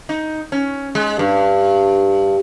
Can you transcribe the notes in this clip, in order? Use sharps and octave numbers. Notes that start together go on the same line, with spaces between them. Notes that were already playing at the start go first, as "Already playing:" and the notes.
D#4
C#4
G#3
G2